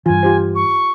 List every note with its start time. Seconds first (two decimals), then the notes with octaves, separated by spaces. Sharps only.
0.06 G2 E3 F4 G#5
0.23 F4 G4 C5
0.55 C#6